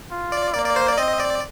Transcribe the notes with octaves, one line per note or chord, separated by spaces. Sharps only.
F4
D5
A#3 D5
D5
C5
D5
C4 D#5
D5